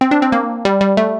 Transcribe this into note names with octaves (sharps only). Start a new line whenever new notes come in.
C4
D4
C4
A#3
G3
G3
A3